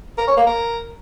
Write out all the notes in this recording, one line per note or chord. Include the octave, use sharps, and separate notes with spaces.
A#4
C#5
A#3
A#4